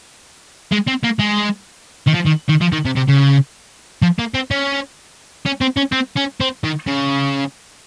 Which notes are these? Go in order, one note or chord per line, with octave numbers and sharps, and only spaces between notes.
G#3
C4
A#3
G#3
D#3
F3
D#3
D#3
F3
D#3
C3
C3
C#3
F3
A#3
C4
C#4
C#4
C4
C#4
C4
C#4
C4
D#3
C#3